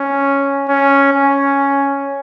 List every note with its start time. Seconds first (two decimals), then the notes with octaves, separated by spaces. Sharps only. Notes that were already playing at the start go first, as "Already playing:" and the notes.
Already playing: C#4
0.69 C#4
1.13 C#4